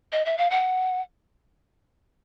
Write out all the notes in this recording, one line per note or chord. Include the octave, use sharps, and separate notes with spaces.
D#5
E5
F5
F#5